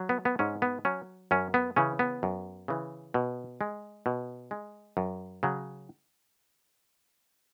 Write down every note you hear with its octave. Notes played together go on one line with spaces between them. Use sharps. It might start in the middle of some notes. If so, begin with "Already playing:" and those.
Already playing: F#3
B3
B3
G#2 C#4
B3
F#3 C#4
F#2 C#4
B3
C#3 E3 C#4
B3
F#2
C#3 E3
B2
G#3
B2
G#3
F#2
C#3 F#3